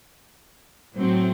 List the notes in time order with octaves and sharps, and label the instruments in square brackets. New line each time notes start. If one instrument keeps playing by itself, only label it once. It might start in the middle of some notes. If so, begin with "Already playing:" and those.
[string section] A2 F#3 C4